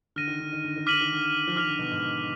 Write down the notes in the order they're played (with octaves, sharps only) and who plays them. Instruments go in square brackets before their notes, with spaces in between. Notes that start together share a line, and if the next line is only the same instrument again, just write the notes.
[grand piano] D3 [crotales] F6 A#6 D#7
[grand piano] D#3
D3
D#3
D3
D#3
[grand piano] D3 [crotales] D6 F6 B6 D#7 F#7
[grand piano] D#3
D3
F3
[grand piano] D#3 [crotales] D6 F6 B6 F7
[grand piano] D3
B2
G#2